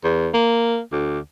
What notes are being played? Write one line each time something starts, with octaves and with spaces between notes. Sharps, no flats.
E2
A#3
D2